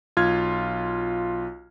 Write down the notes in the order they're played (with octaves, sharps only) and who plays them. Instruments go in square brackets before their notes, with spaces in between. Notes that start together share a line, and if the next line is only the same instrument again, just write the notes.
[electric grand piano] B1 F4 F6 G#6